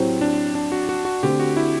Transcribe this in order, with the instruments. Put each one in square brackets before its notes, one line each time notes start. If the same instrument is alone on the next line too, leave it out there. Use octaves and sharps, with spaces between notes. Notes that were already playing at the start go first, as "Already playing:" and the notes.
Already playing: [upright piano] A2 F#3 C4 G4 C5
[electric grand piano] D4
D4
F#4
F#4
F#4
[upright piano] D3 A3 C4 [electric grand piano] G4
[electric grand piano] F#4
E4